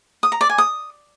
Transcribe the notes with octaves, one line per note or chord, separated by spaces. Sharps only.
D#6
A#5
D5
G#5
D#6